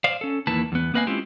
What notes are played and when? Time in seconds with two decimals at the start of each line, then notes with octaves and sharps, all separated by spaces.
0.04 C5 D5 F5
0.21 C#4 A4
0.47 E2 D#3 A#3 E4 B4 A5
0.72 E2 B3
0.94 A#3 C4 B4 D#5 F5 G#5
1.07 G#3 C4 C#4 E4 F4 G4